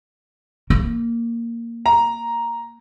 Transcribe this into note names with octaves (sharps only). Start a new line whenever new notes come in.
A#3
A#5